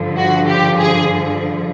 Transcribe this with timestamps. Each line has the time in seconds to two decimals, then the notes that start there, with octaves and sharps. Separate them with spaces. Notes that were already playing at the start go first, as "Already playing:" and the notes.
Already playing: G2 D3 F3
0.17 F#4
0.48 G4
0.79 G#4